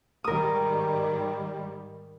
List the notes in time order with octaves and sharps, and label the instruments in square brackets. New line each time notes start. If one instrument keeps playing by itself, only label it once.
[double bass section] G#2 D#3 G3 [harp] A#4 D#6